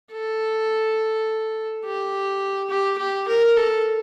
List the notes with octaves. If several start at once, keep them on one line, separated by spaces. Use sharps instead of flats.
A4
G4
G4
G4
A#4
A4